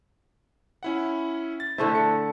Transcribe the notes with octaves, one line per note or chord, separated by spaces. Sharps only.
C#4 E4 F#5
A6
D3 A3 E4 C5
C#7